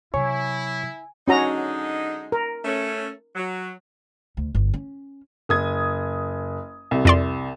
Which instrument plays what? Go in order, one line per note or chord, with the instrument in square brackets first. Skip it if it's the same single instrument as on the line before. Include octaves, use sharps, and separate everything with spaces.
[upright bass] C3 F#3 [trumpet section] E4 [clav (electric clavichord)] C#5 [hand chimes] G#5
[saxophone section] D3 G#3 D#4 [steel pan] C#4 F#4 A#5
[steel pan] A#4
[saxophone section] A3 C#4
F#3
[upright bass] D2
G1
C#4
[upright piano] F#1 D#6 G#6
C2
[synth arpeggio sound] F2 D5 C6